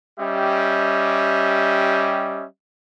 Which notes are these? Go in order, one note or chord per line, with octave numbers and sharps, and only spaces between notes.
G3 C#4 G4 D#5 E5